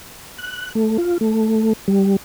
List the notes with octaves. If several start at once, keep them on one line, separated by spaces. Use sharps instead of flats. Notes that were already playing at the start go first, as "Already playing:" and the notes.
F#6
A3
F4
A3
G3